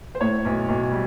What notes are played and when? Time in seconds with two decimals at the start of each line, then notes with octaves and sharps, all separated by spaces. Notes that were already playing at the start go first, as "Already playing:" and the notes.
0.15 C5
0.21 A2 C#5
0.45 B1
0.69 B1
0.92 G3